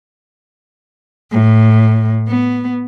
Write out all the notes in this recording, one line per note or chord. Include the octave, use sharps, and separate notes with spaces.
A2
B3